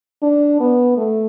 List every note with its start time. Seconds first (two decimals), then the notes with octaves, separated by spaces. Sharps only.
0.22 D4
0.60 B3
0.97 A3